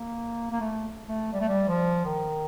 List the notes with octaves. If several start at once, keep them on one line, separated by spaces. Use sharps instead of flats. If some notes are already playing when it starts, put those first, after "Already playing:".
Already playing: A#3
A#3
A3
A3
G3
A3
G3
F3
D#3